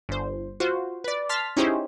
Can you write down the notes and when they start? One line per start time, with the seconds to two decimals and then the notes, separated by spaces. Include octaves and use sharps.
0.09 G1 C5
0.60 F4 F#4 C5
1.04 B4 D5
1.29 A5 C6 F6 A6 B6
1.57 C#4 D#4 E4 G4 G#4 C5